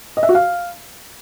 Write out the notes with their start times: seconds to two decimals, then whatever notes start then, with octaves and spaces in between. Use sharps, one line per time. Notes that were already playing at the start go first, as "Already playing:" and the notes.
0.17 D#5
0.23 E5
0.29 F#4
0.35 F5